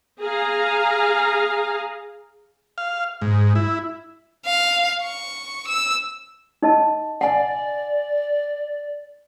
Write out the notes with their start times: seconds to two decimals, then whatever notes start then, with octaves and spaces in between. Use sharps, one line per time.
0.22 G#4 F5 A#5
2.78 F5
3.22 G#2
3.55 E4
4.45 F5
5.03 C#6
5.67 E6
6.62 D#4 D#5 A5
7.21 D5 F#5 G#5